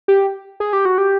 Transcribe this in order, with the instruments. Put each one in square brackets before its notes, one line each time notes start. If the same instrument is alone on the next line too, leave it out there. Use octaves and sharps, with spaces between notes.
[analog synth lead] G4
G#4
G4
F#4
G4